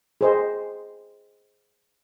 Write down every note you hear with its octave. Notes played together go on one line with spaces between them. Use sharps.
G#4 C5 D#5